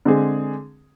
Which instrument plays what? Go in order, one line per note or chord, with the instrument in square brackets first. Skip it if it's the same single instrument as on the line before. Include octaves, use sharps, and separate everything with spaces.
[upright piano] D3 G#3 C4 G#4